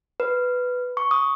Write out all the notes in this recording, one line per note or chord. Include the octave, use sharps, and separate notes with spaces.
B4
C#6
D#6